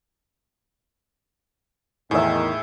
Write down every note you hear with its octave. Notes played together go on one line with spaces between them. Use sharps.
E2 A2 D#3 G#4 E5